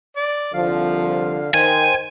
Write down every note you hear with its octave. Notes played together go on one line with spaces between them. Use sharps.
D5
C2 D3 F3 F5
D#3 C5 G5 G#5